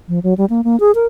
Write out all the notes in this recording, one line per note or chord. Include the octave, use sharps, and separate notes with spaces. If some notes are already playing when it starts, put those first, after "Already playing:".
F3
F#3
G3
A#3
A#3
G#4
A#4